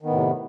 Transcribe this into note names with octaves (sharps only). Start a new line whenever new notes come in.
A2 C3 D#3 B3